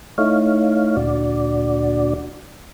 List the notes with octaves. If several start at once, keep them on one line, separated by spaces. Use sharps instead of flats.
A3 D#4 E4 C#5 F5
D2 A#2 D4 F#4 D5